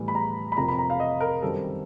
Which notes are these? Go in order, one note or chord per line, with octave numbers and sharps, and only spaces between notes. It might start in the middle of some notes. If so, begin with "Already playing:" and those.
Already playing: A2 E3 G3 B3
B5
A#5
B5
F2 C3 F3 A#3 A#5
B5
A#5
F5
D#5
A#4
F#2 D#3 G3 C4 A4